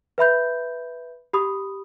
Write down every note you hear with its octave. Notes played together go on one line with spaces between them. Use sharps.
B4 E5 B5 G6
G4 B5 D#6